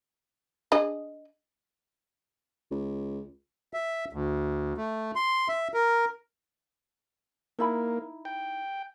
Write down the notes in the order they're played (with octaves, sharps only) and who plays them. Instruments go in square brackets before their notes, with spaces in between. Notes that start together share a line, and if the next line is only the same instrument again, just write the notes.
[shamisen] D4 G#4 D#5
[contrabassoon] C#2
[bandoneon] E5
D2
A3
C6
E5
A#4
[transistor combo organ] A#3 [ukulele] D#4 E4 B5
[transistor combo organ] G5